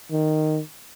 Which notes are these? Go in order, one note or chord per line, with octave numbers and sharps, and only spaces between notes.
D#3